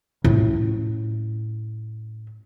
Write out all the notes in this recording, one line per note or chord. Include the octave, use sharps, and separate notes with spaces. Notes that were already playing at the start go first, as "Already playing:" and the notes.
A2 C#4